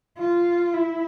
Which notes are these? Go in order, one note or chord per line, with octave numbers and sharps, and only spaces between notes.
F4
E4